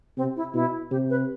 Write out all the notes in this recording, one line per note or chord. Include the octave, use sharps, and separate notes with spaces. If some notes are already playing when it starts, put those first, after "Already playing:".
C3 C4
E4
B2 E4
C3 G4
B4